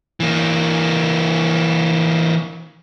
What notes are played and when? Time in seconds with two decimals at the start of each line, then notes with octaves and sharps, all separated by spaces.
0.20 E3 A#3